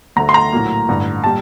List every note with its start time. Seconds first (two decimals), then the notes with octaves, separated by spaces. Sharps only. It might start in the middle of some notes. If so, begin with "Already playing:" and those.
0.16 D2 D3 A3 A#5
0.29 C6
0.34 A#5
0.52 A#1 A2 F#3 A#3
0.89 A1 G2 D3
1.24 A#2 G3 A5